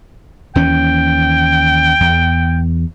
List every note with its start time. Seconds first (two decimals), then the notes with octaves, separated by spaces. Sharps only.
0.56 D#2 E3 C#4 G5
2.00 E2